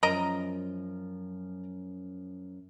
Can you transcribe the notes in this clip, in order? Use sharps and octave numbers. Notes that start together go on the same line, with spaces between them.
F#2 F3 A#4 D#5 A#5